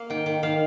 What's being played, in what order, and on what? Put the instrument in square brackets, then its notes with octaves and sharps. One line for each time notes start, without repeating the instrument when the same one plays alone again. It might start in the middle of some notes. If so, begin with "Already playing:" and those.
Already playing: [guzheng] A#3 F5
D#3 G5
D#3
D#3 F5